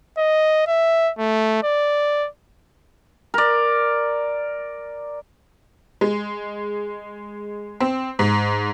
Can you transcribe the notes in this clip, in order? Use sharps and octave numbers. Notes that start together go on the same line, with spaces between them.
D#5
E5
A3
D5
A#4 D5
G#3
C4
G#2